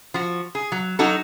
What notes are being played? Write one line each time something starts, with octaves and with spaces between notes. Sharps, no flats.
F3 F#4
G#4
F#3
F#3 D#4 F#4 A4